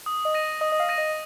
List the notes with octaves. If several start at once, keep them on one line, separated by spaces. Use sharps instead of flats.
D#6
D#5
A#6 D#7
D#5 D#6
D#5
F5
A#6 D#7
D#5